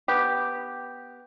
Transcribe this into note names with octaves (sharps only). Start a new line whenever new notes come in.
B3 G4